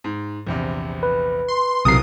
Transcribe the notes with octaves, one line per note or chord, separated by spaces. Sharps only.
G#2
A#1 E2 C3
B4
C6
D1 B1 C3 E3 A#4 D#6 C7